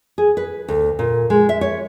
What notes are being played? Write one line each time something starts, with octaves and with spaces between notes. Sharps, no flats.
G#4
B4
D2
A#2
G#3
E5
C#5